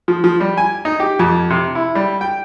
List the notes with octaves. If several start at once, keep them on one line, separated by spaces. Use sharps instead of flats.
F3
F3
G3
G#5
D#4
G4
F2
C3
E4
G3
G5